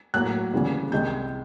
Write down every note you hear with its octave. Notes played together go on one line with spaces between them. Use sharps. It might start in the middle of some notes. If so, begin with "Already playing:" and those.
A2 F#3 A#3 F#6
D2 C#3 E3 G3 A#3
C2 C3 D#3 G#3 G6